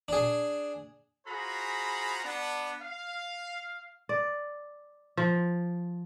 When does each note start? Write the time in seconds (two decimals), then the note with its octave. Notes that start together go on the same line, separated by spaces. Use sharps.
0.08 D4 G#4
1.27 F4 F#4 G#4 C5 A#5 B5
2.24 B3 D4
2.82 F5
4.09 D5
5.17 F3